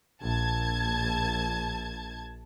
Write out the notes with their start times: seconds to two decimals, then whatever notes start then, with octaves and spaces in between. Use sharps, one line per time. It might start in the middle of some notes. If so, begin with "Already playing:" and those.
0.22 A#1 A5 G#6